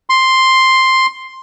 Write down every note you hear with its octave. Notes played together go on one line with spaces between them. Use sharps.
C6